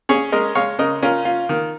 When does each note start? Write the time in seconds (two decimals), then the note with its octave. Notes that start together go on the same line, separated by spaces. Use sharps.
0.09 C#4 G#4 C#5
0.32 G#3 A#4 D#5
0.55 G#3 C#5 F5
0.79 C#3 A#4 D#5
1.02 C#4 F4 A#4
1.25 F4
1.49 D#3